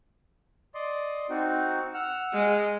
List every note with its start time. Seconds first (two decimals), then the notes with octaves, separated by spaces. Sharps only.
0.75 D5 D#5 C6
1.30 C4 D#4 F#4
1.94 F#5 E6 F6
2.34 G#3